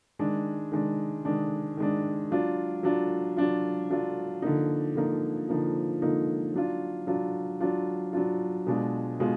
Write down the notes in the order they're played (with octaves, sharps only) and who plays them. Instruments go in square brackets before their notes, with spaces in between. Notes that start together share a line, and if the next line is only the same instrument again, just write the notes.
[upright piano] D#3 G#3 D4
D#3 G#3 D4
D#3 G#3 D4
D#3 G#3 D4
F#3 D4 F4
F#3 D4 F4
F#3 D4 F4
F#3 D4 F4
D3 F3 A#3 D#4
D3 F3 A#3 D#4
D3 F3 A#3 D#4
D3 F3 A#3 D#4
F#3 D4 F4
F#3 D4 F4
F#3 D4 F4
F#3 D4 F4
B2 G#3 D4 F4
B2 G#3 F4